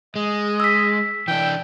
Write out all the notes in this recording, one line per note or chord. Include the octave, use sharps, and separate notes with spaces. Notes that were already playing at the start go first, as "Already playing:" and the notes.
G#3 D#5
E6 B6
E3 D4 G5